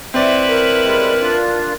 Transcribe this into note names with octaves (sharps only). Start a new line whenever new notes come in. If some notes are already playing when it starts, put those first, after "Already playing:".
C4 E4 B4 D5 E5
A#4
G3 G#3
D4 F4